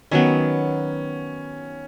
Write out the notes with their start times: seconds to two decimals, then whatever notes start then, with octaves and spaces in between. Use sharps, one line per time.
0.11 D#3 F#3 B3 C#4